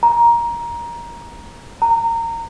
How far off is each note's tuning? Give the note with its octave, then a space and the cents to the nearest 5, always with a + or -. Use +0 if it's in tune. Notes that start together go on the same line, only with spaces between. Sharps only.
A#5 +15
A#5 -20